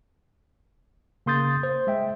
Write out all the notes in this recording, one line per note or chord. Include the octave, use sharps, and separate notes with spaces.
C#3 A#3 C6 D#6 G6 A6
C5
G#3 E5 G5